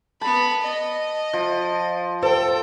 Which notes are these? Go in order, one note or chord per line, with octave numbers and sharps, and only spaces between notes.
B3 A5 B5
D#5
F3
A4 C5 G5